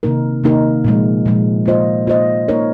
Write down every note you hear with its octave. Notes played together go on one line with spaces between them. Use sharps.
C3 D#3 A#3 D#4 A#4
C3 D#3 A#3 D#4 A#4
A#2 F3 G#3
A#2 F3 G#3
A#3 F4 C5 D#5
A#3 F4 C5 D#5
A#3 D#4 A#4 C#5